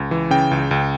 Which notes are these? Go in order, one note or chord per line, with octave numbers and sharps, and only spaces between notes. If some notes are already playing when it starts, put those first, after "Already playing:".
Already playing: C#2
E3
C#3 G5
C#2
C#2